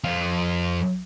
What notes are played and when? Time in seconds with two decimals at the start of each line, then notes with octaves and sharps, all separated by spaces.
0.04 F2 F4